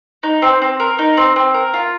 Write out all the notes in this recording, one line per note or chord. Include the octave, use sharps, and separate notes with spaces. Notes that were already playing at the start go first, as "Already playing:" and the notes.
D#4
C4
C4
A#4
D#4
C4
C4
A#4
F4